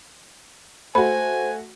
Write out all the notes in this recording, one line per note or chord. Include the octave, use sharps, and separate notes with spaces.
A3 F#4 C5 G#5 B5